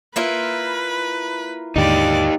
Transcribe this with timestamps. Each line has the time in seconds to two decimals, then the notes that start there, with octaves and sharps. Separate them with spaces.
0.16 A#3 E4 F4 B4
1.76 D#2 G#2 D3 D#4 G4 D5